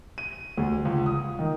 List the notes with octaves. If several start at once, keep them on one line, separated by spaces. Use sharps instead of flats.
D#7
D2
C#2
D#6
D#3